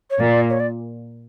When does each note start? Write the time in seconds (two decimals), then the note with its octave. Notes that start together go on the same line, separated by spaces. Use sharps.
0.10 C#5
0.20 A#2 D5
0.50 C#5
0.60 D5